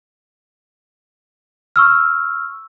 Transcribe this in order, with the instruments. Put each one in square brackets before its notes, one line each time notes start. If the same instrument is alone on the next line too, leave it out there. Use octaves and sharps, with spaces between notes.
[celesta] C#6 E6 F6